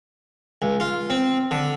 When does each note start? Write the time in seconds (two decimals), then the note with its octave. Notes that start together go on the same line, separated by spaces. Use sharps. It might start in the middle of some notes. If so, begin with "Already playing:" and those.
0.62 C#2
0.80 F4
1.10 C4
1.51 D3